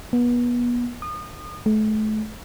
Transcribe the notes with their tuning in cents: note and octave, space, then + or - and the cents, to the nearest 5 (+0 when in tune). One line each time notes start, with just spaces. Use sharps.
B3 -30
D#6 -30
A3 -35